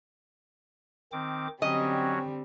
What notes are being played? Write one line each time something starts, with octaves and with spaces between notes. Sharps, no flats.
D#3 C4 D6
D3 F#3 G3 C4 C#4 F#4 D#5